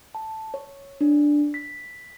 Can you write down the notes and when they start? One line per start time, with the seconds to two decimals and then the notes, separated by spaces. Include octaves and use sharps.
0.15 A5
0.54 C#5
1.01 D4
1.54 B6